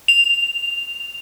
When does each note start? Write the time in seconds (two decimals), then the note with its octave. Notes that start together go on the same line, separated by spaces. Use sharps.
0.08 F7